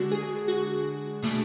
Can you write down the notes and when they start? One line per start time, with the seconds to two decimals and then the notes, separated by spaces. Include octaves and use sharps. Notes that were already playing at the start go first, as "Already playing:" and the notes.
Already playing: D3 G#3 D4 F#4
0.11 G#4
0.48 F#4
1.22 B2 A3 D4 G#4